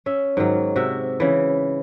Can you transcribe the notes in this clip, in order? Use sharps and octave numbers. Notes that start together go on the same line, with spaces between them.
C#4 E5
G#2 D#3 F#3
C3 F#4 E5
C#3 E3